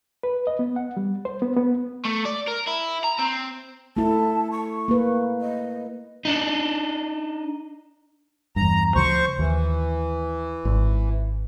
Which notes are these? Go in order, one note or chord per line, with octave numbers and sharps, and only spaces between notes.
B4
D#5
B3
F#5
G3
C5
B3
B3
A3
D5
A#4
E4
A#5
C4
A3 E4 A5
C#6
A#3 B4
D#5
D4 D#4
E2 G2 A#5
D2 C#3 F3 C5 C#6
D#2 E3
G#1